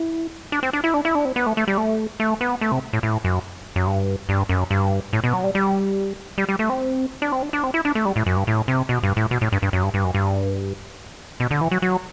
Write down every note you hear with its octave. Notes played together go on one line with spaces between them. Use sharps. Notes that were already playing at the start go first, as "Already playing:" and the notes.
Already playing: E4
D4
C4
D4
E4
D4
E4
D4
C4
B3
A3
A3
G3
A3
A3
B3
A3
C3
A2
A2
F#2
F#2
G2
G2
F#2
G2
A2
B2
F#3
G3
G3
G3
G3
A3
C4
D4
C4
D4
D4
C4
E4
D4
A3
G3
A2
F#2
G2
A2
C3
B2
G2
A2
B2
A2
G2
G2
F#2
G2
G2
F#2
G2
B2
D3
E3
F#3
F#3